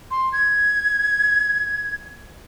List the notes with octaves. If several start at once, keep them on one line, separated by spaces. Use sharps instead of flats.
C6
G#6